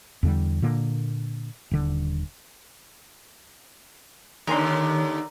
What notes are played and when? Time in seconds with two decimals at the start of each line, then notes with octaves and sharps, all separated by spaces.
0.23 E2 D3 G3
0.62 A#2 D3 A#3
1.71 D#1 D3
4.47 D#2 D3 D#3 A#4 G#5 C6